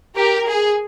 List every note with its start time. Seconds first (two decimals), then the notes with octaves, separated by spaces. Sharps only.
0.14 G4 A#4
0.48 G#4